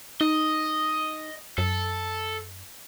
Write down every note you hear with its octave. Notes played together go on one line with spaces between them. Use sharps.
D#4 D#5
F#2 A4